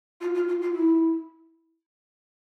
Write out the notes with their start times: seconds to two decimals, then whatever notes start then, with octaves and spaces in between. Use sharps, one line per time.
0.21 F4
0.35 F4
0.48 F4
0.61 F4
0.75 E4